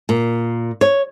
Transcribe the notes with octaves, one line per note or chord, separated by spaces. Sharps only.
A#2
C#5